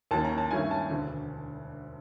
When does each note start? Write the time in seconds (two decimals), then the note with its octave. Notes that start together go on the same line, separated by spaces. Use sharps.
0.11 D#2 D#3 F#3 A#3 C#4 A5
0.25 A#5
0.38 A5
0.51 G2 D#3 F#3 A3 C#4 G#5
0.71 A5
0.90 E1 D2 D3